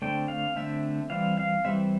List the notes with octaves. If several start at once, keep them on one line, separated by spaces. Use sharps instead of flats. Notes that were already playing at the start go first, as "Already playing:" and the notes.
D3 A3 C4 G5
F5
D3 A3 C4 E5
E3 G3 C4 F5
F5
E3 G3 C4 E5